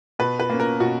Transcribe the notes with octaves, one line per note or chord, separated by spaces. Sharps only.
B2 B4
B4
A#3 C#4
A#4
B2 F#4